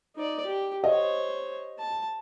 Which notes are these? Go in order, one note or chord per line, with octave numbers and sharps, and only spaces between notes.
D#4 D5
G4
C5 C#5 D#5
A5